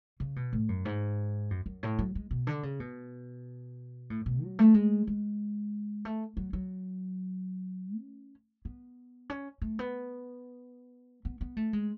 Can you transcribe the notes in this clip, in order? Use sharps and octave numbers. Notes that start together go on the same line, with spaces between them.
C#3
B2
A2
F#2
G#2
F#2
F#2
A2
F#3
G#3
B2
D3
C#3
B2
A2
B2
F#3
A3
G#3
G#3
A3
F#3
F#3
C#4
B3
C#4
A3
B3
B3
B3
A3
G#3